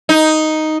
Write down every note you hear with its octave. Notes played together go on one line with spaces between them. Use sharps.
D#4